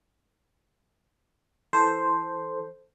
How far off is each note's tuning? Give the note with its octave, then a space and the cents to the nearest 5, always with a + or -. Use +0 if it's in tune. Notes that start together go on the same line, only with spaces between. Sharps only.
E3 +0 A4 +0 C5 +0